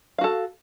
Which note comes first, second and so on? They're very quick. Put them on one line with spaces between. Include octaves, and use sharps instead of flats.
F5 F#4 A4